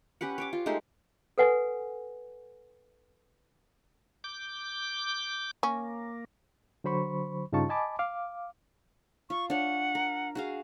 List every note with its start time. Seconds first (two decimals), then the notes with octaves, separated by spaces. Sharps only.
0.21 C#4 G4 B4 F#5
0.38 C#5 G5 D6
0.53 F4
0.66 G#3 A3 D#4 G4
1.38 A4 B4 F#5 G#5
4.24 D6 G6
5.63 A#3 C#4
6.84 D3 F#3 C5 B5 C#6
7.52 G2 C#3 D#4 F4 A5 C#6
7.69 D#5 G#5 A5 B5 D6
7.99 F5 D6
9.30 F4 C#6
9.50 D4 C#5 F#5
9.95 A#4
10.35 F#4 G#4 F5